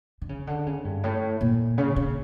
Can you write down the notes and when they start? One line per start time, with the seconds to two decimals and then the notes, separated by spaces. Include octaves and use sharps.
0.22 D3
0.29 C#3
0.47 D3
0.66 C#3
0.85 G2
1.04 A2
1.41 A#2
1.78 C#3
1.96 C#3